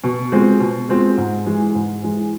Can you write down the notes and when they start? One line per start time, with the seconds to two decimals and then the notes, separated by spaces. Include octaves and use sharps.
0.04 B2
0.32 G#3 C4 F4
0.60 B2
0.89 G#3 C4 F4
1.17 G#2
1.46 E3 G#3
1.75 G#2
2.03 E3 G#3